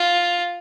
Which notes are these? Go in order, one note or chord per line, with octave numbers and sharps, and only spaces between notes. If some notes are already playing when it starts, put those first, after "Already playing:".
Already playing: F4